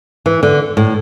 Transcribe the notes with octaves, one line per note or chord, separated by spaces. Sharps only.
E3
D3
A2